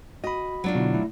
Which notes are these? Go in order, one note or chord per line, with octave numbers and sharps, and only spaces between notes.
F#4 D#5 B5
F#3 D4 F4
B2 D3 E4
A3 E4